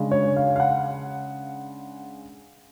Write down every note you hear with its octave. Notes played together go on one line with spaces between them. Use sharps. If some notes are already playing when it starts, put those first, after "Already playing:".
Already playing: C#3 G#3 D4
C#5
F5
F5
F#5